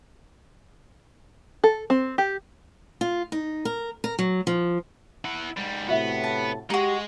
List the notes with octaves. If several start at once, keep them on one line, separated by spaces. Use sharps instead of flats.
A4
C4
G4
F4
D#4
A#4
A#4
F#3
F3
E4 F#5
G#2 G3
A2 C3 B3 F#4 E5 F#5
A5
G#3 D#4 F#4 G4